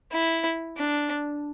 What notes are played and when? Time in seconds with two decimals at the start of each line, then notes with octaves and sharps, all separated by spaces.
0.12 E4
0.77 D4